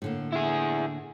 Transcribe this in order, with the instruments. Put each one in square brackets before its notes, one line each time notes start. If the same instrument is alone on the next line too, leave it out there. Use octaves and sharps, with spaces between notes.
[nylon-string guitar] A2 D3 A#3
[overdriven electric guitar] E4 G#4